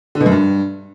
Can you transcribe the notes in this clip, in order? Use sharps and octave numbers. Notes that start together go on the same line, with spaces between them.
D3
B2
F#2
G2